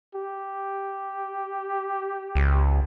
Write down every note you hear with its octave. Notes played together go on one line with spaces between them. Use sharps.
G4
C#2